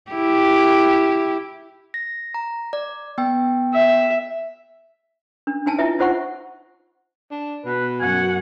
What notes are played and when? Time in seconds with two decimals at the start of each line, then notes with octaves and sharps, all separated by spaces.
0.11 E4 G4
1.94 A#6
2.34 A#5
2.73 D5
3.18 B3 G5
3.74 E5
5.47 D4
5.66 D4 D#4 G#5 A5
5.79 E4 F4 B4 E5
5.99 D#4 F4 C5 F#5 C#6
7.31 D4
7.66 B2 B4
8.01 F#2 F#4 F#5 G#5